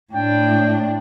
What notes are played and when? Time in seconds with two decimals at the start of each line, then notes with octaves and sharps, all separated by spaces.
0.13 A2 D4 G5